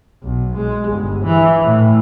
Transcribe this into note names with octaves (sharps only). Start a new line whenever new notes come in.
B1
G#3
G1
E3
A2